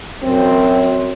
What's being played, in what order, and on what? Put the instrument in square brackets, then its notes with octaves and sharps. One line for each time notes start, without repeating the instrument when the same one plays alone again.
[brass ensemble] F#2 C4